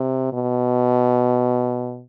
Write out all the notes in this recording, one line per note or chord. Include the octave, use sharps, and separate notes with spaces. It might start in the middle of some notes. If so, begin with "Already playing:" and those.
Already playing: C3
B2